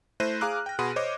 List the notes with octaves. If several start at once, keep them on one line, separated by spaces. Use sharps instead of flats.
A3 E4 C5 F#6 A#6 D#7
G#4 F5 A#5 D6 F6 F#6
G5 A#6
B2 G#4 F#5 B5 C6 D#7
C5 C#5 D#5 D6